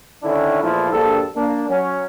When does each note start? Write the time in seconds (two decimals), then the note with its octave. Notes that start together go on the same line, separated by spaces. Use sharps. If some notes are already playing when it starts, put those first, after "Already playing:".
0.23 D3 D#3 C#4 D4 E4
0.62 E2 A#2 F3 A3 E4 F4
0.91 A#1 G2 A#3 A4
1.34 A#3 D4
1.69 F#3 C#4